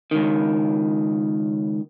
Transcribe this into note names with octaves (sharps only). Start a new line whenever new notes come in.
C#2 D#3